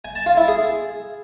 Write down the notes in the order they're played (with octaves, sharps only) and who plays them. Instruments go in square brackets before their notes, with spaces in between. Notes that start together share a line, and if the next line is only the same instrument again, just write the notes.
[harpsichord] G#5
A5
F4
E4
G#4